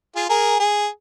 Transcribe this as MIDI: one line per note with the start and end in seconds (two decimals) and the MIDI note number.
0.16 0.25 65
0.16 0.25 68
0.29 0.55 68
0.29 0.55 70
0.60 0.87 68